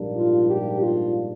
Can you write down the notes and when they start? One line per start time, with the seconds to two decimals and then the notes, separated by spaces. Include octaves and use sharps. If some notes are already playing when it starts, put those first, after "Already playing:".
Already playing: A#1 G#2 G3 A#3 D4
0.15 F4
0.47 G4
0.81 F4